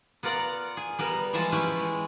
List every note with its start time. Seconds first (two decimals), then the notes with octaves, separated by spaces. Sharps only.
0.23 B3 F4 A#4 D5 F#5
0.77 G#4
0.99 G3 B3 A#4
1.33 E3 F3 G3 G#3 A5
1.52 C#4 E4 G4 B4 G5
1.79 G#3